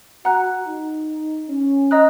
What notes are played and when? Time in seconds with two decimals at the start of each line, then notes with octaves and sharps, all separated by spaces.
0.24 F#4 F#5 A#5 F#6
0.66 D#4
1.49 C#4
1.91 D#5 A#5 D#6 F#6